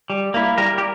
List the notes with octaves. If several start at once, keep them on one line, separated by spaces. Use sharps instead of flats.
G3
A#3 E4
G3 A#4
G4